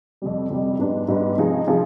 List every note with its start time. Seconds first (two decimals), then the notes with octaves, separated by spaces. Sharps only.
0.22 F2 C3 G3
0.50 F2 C3 G3
0.79 G#2 G3 B3 D4
1.08 G#2 G3 B3 D4
1.38 C3 F3 C4 D#4 G#4
1.67 C3 F3 C4 D#4 G#4